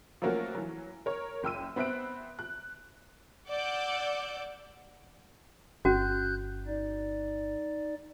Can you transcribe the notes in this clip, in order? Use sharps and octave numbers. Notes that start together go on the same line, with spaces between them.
F3 F#3 A3 A#3 C#4 F#4
E3 F#3
A#4 C#5
F#1 G5 E6 D#7
B3 C4 E5 F#6 D7
F#6
D5 F#5 D6 E6 G6
G1 C#4 F#4 F#6 G6
D#4 D5